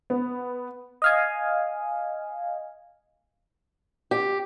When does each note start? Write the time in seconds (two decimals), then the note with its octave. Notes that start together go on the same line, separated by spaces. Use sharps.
0.10 B3
1.02 D#5 F5 G#5
4.11 G4